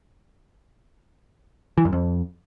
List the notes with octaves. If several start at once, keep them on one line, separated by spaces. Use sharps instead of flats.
E3
F#2
F2